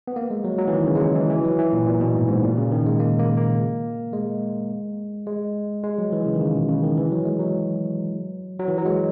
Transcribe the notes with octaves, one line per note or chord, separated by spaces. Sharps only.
B3
A#3
G#3
F#3
F#3
E3
D#3
C#3
G#3
F#3
E3
E3
F#3
E3
A#2
A#2
B2
G#2
G#2
A#2
C#3
D#3
G#3
A#3
A#3
A#3
G#3
G#3
G#3
F#3
E3
C#3
D#3
C#3
B2
C#3
D#3
E3
F#3
G#3
F#3
F#3
E3
F#3
G#3